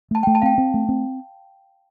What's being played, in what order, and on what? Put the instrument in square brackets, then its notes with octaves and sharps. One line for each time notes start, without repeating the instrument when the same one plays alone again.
[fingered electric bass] A3 [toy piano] A5
[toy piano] G5
[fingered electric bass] A3
[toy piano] A5
[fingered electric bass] C4 [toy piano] F5 G5
[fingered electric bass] C4
A3
C4